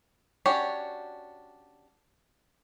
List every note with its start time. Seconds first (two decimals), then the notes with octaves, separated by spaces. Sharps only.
0.46 C#4 D4 F#4 G4 C#5